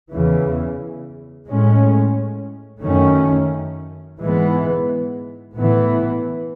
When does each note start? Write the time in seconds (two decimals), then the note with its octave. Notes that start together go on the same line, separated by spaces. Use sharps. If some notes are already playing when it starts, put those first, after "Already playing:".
0.11 E2 C#3 E3
1.47 A2 G#3 C#4
2.83 F#2 D#3 A3 C#4
4.19 G#2 E3 G#3 B3
5.56 A2 E3 B3